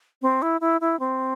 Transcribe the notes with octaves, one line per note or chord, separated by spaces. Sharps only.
C4
E4
E4
E4
C4